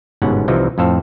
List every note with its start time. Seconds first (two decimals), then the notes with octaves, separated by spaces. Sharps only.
0.22 G1 G#2 B2 C#4 F#5
0.48 C2 C3 E3 F3 D#4
0.78 F2 A2 A4 C5 F5